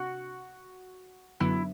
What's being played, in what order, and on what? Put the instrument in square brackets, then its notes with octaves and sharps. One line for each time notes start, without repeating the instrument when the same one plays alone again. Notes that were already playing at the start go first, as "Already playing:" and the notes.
Already playing: [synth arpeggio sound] C3 D4 [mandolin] F#4
[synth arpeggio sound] F#2 D3 F#3 B3 [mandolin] E4